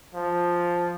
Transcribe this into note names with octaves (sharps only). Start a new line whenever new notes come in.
F3